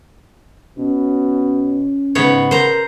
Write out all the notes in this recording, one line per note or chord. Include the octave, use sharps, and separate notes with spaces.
B2 C#4
G#2 C#3 B3 C#5
A#4 C5 A#5